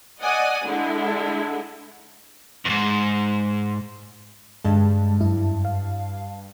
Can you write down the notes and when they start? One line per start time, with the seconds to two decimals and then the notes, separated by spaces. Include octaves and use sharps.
0.21 D5 D#5 F#5 G#5 D#6
0.65 D3 G#3 E4
2.65 E2 G#2
4.65 G2 D3 G#3 A5
5.21 F#2 E4
5.65 F5